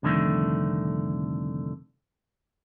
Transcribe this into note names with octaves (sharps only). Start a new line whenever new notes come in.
C2 F2 D3 D#3 A3